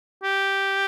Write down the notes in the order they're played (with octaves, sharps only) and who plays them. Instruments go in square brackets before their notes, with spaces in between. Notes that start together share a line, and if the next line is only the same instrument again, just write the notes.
[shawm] G4